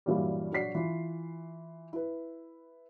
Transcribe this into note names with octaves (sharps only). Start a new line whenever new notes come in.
G2 A#2 E3 F#3 G3
A#1 F#3 F#4 D5 B6 C7
E3 F4
E4 B4